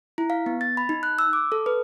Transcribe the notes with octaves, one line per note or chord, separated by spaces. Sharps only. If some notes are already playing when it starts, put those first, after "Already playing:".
E4
F5
B3
A6
B5
D#4
F#6
E6
D6
A4
B4